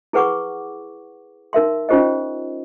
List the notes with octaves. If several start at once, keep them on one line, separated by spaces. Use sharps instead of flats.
E4 G#4 B4 F#5 C#6 D6
D#4 A#4 E5 C6
C#4 D#4 F4 G4 C5 D#5